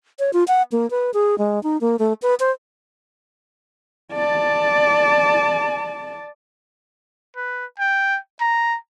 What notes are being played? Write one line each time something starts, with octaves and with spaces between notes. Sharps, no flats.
C#5
F4
F#5
A#3
B4
G#4
G#3
D#4
A#3
A3
B4
C5
D5 A5
B4
G5
A#5